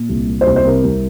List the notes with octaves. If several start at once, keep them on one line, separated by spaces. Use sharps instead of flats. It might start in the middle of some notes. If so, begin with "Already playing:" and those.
Already playing: A#2
C2
A#3
C5
C2
C5
C3 A#4
C2